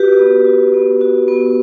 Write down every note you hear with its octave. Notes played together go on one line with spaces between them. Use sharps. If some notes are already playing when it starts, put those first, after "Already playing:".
Already playing: F#4 G4 B4
B3
F#4
B3
F#4
B3